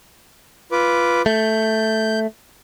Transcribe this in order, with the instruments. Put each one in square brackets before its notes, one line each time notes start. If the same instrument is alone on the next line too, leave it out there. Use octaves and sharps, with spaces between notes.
[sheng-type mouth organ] F4 B4 D6
[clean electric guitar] A3 [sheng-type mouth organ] G6